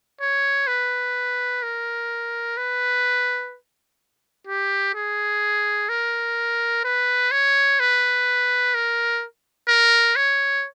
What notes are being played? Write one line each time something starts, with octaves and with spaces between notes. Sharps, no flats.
C#5
B4
A#4
B4
G4
G#4
A#4
B4
C#5
B4
A#4
A#4
C#5